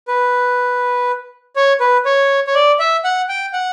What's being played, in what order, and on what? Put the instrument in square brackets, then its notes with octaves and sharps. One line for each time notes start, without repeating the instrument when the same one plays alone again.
[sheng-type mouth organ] B4
C#5
B4
C#5
C#5
D5
E5
F#5
G5
F#5